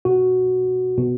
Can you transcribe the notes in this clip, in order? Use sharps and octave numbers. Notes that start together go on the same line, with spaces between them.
B2 F#4
B2